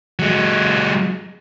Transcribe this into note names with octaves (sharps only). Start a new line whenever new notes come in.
F#3 G#3